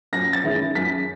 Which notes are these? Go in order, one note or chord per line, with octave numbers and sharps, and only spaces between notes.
F#2 A#6
A6
D#3 G#3 C#4 E4
F#2 B6